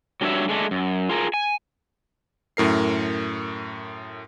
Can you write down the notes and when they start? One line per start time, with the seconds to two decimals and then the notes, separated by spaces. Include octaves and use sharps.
0.21 F#3 G3 D4 F#4 C#5 E5
0.49 G#3 A3 D4
0.71 F#2
1.09 F4 G#4 A#4
1.34 G#5
2.57 F#2 A2 A#4 C7